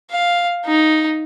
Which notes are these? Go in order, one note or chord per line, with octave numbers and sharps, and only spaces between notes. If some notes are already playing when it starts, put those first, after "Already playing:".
F5
D#4